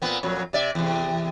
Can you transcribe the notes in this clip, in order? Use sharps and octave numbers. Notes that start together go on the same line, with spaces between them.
A#2 B3 C4
F2 A#2 F#3
C3 D5 E5
E2 C3